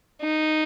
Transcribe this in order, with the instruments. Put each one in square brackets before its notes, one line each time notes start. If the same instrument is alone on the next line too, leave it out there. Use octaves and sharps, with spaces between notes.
[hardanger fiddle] D#4